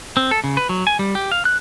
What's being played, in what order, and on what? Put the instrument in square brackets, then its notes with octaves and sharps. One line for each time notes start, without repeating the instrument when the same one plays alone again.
[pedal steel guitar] C4
A4
C#3
B4
F#3
G#5
G3
G4
F5
F#6